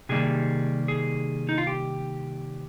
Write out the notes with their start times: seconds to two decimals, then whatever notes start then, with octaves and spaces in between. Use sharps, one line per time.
0.09 C3 D#3 G3 A#3 G#4
0.88 G#4
1.49 D#4
1.58 F4
1.67 G4